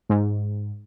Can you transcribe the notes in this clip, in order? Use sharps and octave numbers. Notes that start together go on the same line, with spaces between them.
G#2